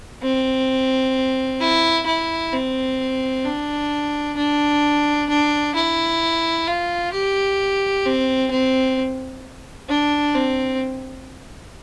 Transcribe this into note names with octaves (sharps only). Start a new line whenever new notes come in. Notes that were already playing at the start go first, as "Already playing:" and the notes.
C4
E4
E4
C4
D4
D4
D4
E4
F4
G4
C4
C4
D4
C4